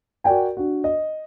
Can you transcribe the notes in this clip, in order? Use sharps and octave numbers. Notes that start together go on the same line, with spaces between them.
F#4 A#4 D5 G5 G#5
D4 F#4
D#5